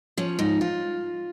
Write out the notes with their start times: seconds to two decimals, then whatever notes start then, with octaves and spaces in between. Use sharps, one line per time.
0.17 F3 C#4
0.39 G#2 D#4
0.61 F4